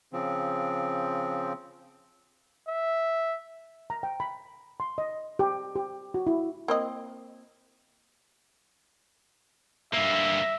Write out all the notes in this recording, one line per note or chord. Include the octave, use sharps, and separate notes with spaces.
C#3 F3 C4
E5
A#5
G5
B5
C6
D#5
G4
G4
F#4
E4
A#3 C4 D#5
G2 A#3 E5